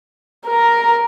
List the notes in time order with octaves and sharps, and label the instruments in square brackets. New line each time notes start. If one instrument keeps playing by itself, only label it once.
[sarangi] A#4